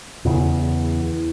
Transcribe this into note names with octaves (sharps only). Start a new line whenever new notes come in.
E2 C#3 E3